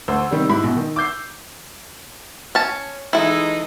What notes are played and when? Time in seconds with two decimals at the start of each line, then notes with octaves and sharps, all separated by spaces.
0.08 D2 C5 E6
0.31 C3 D#3 G3
0.49 G#2 E4 B5
0.62 A#1 B2
0.76 D#3
0.96 D6 E6 G6 C7
2.55 C#4 A5
3.13 E3 G#3 D#4 E4 A4